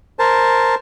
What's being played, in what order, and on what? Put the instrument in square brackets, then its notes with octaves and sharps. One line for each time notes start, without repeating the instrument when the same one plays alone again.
[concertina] A#4 C5 A5